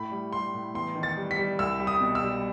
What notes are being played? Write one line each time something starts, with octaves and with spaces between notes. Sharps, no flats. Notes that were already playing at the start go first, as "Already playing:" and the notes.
Already playing: A2 A3 B5
G3
G3 C6
A2
E2 C6
D#3
A6
G3
B6
G3
C2 E6
G3
D#6
B2
E6
G3